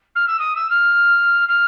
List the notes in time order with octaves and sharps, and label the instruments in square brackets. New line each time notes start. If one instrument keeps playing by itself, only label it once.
[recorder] F6
E6
D#6
E6
F6
F6